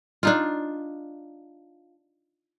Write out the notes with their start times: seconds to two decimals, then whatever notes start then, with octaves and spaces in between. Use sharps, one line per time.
0.23 D4 D#4 F4